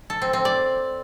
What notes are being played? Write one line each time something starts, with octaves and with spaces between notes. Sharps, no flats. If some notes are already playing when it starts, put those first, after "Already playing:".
A4
C4
C4
D5